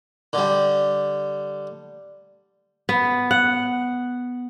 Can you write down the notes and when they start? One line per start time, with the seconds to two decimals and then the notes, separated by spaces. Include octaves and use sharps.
0.33 D3 G3
2.89 B3
3.31 F#5